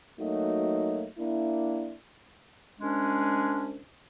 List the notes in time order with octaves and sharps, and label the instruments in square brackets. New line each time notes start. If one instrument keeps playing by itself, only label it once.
[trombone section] F#3 A3 A#3 D#4 F#4
A#3 D4 E4
[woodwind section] C2 G#3 C#4 D4